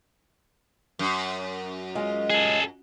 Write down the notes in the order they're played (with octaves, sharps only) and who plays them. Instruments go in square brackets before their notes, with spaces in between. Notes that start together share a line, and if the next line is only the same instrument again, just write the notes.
[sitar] F#2
[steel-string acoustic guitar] G#3 F4 D#5
[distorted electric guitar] G#4 A4